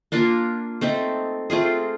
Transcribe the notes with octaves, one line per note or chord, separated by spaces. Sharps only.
A#3 D4 F4 A#4
A3 C4 D#4
A3 C4 F4 G#4